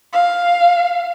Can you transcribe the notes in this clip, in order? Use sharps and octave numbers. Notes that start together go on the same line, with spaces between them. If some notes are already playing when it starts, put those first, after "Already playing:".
F5